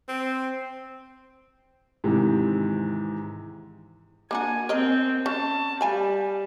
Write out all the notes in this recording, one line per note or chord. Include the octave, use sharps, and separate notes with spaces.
C4
G#2 C3 D#3 E3
A#3 D4 F#4 G#5
C4 A#4 C#5 D#5
C#4 A5
G3 F5 G#5 B5